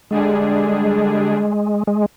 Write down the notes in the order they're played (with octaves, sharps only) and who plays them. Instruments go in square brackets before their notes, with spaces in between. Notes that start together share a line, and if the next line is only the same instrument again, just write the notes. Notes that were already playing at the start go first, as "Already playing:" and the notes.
[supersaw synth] D3 G3 D4 G#4 [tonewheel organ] G#3
[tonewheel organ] G#3